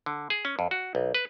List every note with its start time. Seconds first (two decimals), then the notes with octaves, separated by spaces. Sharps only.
0.06 D3
0.30 G#4
0.45 C#4
0.59 F2
0.71 F#4
0.95 B1
1.15 B4